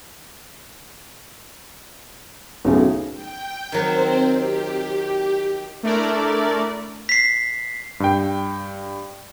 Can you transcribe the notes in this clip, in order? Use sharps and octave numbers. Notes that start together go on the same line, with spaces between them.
B1 A2 C#3 G#4
G5
D#3 F#3 C4 C5
G4
A3 D4 E4 A#4 D5
B6 C7
G2 G5